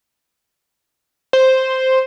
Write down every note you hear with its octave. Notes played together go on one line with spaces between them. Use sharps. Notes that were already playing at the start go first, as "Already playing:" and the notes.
C5